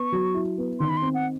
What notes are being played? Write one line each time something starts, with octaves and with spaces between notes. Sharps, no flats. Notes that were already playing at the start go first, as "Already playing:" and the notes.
Already playing: B3 C#6
F#3
E4
B3
D#3 C6
B5
C6
C4
F#5